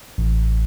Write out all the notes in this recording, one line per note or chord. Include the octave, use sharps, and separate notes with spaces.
A1